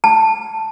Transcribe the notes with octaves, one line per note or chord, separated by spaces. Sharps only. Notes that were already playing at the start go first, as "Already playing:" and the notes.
A5